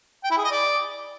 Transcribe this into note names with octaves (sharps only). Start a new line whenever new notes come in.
G5
E4
G#4
D#5
D5